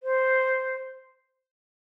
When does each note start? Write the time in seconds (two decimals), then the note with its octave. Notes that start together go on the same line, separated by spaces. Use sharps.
0.03 C5